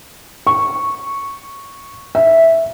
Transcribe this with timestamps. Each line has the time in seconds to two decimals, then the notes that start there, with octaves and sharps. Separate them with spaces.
0.47 C#6
2.15 E5